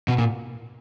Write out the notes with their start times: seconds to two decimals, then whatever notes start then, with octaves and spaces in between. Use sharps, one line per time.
0.08 B2
0.18 A#2